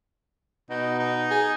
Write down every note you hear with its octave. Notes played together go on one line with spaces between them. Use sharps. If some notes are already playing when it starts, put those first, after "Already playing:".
B2 D#4
D#4
G#4